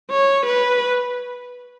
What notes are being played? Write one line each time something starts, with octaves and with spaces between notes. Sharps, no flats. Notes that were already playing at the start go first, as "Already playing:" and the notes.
C#5
B4